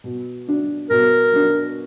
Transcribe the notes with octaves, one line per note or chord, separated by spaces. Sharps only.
B2
F#3 D4
B2 A#4
F#3 D4